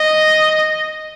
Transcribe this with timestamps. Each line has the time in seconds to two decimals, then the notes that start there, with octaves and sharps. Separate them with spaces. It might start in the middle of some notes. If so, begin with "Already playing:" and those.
Already playing: D#5